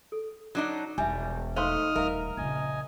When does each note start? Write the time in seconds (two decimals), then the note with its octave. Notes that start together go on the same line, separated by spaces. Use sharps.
0.12 A4
0.55 F#3 D4 D#4
0.98 E1 G3 E5 G#5
1.56 A3 D#4 C5 F5 C6 D#6 F6
1.96 D#1 A3 A#4 E5 F5
2.37 A#1 C#3 D#5 G#5